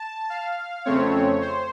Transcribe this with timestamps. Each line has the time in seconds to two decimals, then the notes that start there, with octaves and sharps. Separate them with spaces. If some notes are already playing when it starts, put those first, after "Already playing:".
Already playing: A5
0.30 F5
0.85 F2 C#3 A3 C4 C#5
1.42 C5